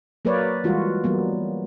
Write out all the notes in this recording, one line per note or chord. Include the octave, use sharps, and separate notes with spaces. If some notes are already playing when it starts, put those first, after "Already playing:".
F#3 A#3 A#4 B4 C#5 D5
E3 G3 G#3 F4 F#4
E3 F#3 G3 A#3 B3